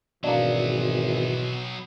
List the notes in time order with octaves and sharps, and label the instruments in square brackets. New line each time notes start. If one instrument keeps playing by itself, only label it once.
[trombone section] G#1 E3 [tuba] B2 [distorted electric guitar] F#3 B3 [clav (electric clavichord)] A#3 D4